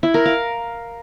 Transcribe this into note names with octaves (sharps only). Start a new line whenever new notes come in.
E4
A#4
F5